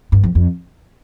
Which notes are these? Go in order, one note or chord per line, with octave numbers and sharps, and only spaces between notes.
G2
F2
F2